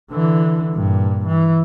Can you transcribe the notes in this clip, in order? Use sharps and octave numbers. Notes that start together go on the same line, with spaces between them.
D3 E3
G2 A#2
E3